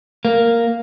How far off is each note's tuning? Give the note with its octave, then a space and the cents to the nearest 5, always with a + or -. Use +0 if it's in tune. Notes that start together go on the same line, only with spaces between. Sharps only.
A#3 -5